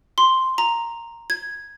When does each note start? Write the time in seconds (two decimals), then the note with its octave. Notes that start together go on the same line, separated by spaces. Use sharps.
0.18 C6
0.58 A#5
1.30 G#6